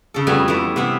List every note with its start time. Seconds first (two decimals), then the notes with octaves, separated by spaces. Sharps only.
0.14 C#3 A4
0.27 F2 F#3 G3 A3 B3 G#5
0.48 E3 G3 A3
0.76 C3 B3 E4